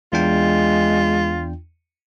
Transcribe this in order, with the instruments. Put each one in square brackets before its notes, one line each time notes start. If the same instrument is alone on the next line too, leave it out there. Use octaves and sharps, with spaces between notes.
[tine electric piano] E2 D4 G5 [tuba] G#3 [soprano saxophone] F4